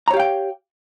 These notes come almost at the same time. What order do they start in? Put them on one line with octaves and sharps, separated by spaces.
A#5 C#5 G4 F5 G5